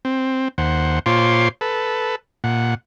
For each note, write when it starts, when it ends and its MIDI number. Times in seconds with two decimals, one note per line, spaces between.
0.05 0.48 60
0.58 0.99 39
0.58 0.99 72
0.58 0.99 78
1.06 1.49 46
1.06 1.49 65
1.06 1.49 72
1.06 1.49 73
1.06 1.49 84
1.06 1.49 86
1.61 2.16 69
1.61 2.16 71
2.44 2.75 46
2.44 2.75 78